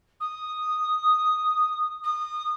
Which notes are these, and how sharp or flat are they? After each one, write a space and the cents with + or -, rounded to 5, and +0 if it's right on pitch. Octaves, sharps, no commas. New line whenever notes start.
D#6 -5
D#6 -25